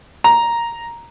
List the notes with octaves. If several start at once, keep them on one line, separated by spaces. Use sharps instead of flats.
A#5